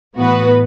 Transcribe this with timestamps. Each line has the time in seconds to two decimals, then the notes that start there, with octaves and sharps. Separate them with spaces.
0.16 A2 E3 B3 F#4 B4